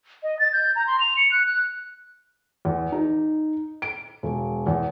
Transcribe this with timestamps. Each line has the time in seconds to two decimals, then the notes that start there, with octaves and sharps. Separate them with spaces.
0.23 D#5
0.39 A6
0.53 G6
0.76 A#5
0.87 C6
1.00 F7
1.17 C#7
1.32 F#6
1.46 F#6
2.65 E2
2.92 D#4
3.82 D7
4.23 E1
4.67 E2